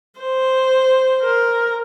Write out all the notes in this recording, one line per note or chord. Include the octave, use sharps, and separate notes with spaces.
C5
A#4